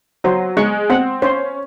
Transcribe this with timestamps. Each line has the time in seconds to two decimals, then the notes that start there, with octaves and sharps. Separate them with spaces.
0.24 F#3 C5
0.57 G#3 C#6
0.90 C4 F#5
1.22 C#4 C5